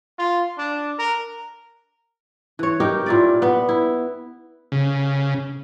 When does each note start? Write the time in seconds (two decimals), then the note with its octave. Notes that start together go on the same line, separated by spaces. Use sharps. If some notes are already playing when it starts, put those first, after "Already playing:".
0.18 F4
0.58 D4
0.98 A#4
2.59 E3 C#5
2.80 D#4 G4 A#4
3.06 A#2 E4 D5
3.42 B3 B4
3.69 E4
4.72 C#3